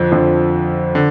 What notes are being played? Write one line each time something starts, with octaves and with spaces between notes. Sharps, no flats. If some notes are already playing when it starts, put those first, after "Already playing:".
Already playing: F2 D3 F3
F2 D3 F3
D3